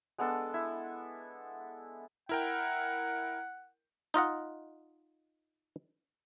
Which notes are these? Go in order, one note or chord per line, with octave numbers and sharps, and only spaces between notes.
G#3 B3 D4 A4
E4
E4 A#4 F#5 G5
D#4 F4 D#5 F#5